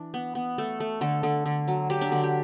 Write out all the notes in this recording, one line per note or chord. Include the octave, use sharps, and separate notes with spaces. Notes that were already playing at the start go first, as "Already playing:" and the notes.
Already playing: E3 D4
B3
B3
A3 A4
A3
D3 A4
D3
D3
F#3
F#3 G4
D4
D3 D4
G4